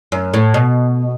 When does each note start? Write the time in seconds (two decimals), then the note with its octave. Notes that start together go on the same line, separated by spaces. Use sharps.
0.12 F#2
0.34 A2
0.54 B2